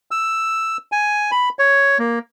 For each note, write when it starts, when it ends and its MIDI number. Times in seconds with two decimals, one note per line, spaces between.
0.11 0.77 88
0.92 1.31 80
1.31 1.49 83
1.59 1.98 73
1.99 2.19 58